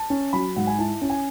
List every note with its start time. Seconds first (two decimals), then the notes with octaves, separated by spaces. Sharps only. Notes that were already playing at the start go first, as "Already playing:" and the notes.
Already playing: A5
0.10 C#4
0.33 F#3 B5
0.56 G#2 F#5
0.67 G#5
0.78 E4 A5
1.02 C#4
1.10 G#5